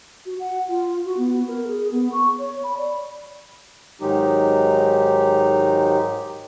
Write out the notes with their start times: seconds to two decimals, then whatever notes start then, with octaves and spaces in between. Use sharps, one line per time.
0.26 F#4
0.40 F#5
0.68 F4
1.05 F#4
1.18 B3
1.48 A#4
1.68 G#4
1.92 B3
2.12 C#6
2.38 C#5
2.63 B5
2.77 D5
4.01 G#2 D#3 F#3 G#3 D#4 G4